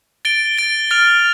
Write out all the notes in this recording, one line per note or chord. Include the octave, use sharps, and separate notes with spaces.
A6 D7 G7
A6 D7 G7
F6 A6 D7 F7